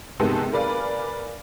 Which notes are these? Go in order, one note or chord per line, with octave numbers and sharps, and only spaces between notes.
C3 D#3 G#3 B3 A4
A#4 B4 D5 F5 G#5